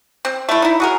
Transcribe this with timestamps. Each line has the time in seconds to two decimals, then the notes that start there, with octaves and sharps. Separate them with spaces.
0.25 C4
0.49 A3 E4
0.62 D#4 E4
0.80 F#4 G#4 A#4